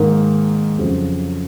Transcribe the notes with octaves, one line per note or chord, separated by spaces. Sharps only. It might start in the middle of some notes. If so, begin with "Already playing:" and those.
Already playing: G#2 D#3 A#3
F2 C#3 F#3 C4